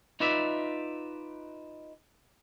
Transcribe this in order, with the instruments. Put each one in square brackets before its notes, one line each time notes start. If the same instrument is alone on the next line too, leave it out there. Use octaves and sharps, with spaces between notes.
[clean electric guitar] D#4 F4 B4 D5 E5